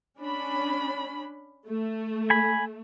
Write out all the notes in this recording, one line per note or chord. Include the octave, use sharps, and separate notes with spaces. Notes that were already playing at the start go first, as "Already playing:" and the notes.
C#4 D4 B5
A3
G#5 B5